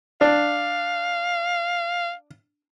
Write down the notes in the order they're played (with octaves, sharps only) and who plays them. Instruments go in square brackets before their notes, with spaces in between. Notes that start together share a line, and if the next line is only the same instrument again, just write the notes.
[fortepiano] D4 [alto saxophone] F5